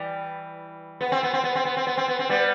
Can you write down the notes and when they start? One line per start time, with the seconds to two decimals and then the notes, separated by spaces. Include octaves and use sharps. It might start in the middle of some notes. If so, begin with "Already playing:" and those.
Already playing: E3 G3
1.01 B3
1.12 C4
1.23 B3
1.33 C4
1.44 B3
1.55 C4
1.65 B3
1.77 C4
1.87 B3
1.97 C4
2.08 B3
2.19 C4
2.29 G3 B3